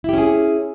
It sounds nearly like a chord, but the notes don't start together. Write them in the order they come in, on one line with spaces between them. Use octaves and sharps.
E4 G4 C#4 G#4